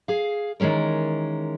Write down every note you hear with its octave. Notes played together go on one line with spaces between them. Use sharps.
G#4 F5
D#3 E3 G#3 C#4 A#4